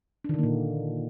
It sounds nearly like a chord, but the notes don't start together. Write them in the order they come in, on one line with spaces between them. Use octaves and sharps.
D4 D#3 D3 A#3 A#2